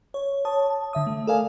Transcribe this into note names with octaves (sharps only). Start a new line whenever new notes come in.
C#5
C#5 A5 D#6
A5
D3 E5 D#6
A3
A4 A#4 D5 F5 G#5